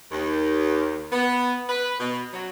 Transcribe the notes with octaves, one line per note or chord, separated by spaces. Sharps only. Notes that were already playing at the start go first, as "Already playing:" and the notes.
D#2
B3
B4
B2
F#3